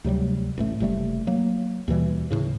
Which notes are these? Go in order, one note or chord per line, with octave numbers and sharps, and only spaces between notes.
D2 C3 F#3 G3
A1 A2 A3
F#1 C3 G3 A3
F#3 A#3
D#2 B2 E3 G3
D1 A#1 A2 C#3